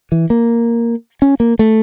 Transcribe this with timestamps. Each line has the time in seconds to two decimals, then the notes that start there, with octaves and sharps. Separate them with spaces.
0.12 E3
0.30 A#3
1.22 C#4
1.40 A#3
1.59 A3